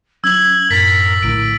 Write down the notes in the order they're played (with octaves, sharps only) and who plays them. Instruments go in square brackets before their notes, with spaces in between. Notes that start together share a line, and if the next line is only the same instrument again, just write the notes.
[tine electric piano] F#3 C#4 [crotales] E6 F#7 [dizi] G#6
[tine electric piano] F#2 A2 [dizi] A#4 [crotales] A6 B6
[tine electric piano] A#1 A2 D3 [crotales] D7